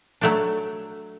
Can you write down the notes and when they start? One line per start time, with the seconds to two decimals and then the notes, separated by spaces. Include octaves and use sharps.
0.21 F#3 A3 D4